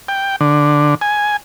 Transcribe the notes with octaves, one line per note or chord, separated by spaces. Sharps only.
G5
D3
G#5